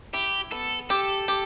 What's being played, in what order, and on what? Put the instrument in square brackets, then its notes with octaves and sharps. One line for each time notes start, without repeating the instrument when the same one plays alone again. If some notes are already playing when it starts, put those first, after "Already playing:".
[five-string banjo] E4 [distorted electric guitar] G4
[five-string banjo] B3 [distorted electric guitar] A4
[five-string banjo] G4 [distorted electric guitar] A4
[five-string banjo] G4